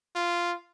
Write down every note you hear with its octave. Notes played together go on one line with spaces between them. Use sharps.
F4